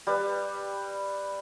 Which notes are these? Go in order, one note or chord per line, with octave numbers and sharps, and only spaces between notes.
G3 B4